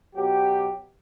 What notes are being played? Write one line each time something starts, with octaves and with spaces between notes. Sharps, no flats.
B2 F#3 G4